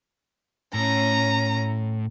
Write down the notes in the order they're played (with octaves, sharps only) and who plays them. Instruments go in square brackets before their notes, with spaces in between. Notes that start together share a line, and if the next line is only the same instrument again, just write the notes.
[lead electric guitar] A2 [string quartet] C#4 A#5